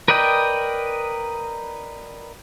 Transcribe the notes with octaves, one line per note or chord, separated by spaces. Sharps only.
A#4 B4 D5 D#5 G5